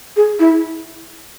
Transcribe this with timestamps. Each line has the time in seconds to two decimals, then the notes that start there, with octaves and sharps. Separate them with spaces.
0.16 G#4
0.39 E4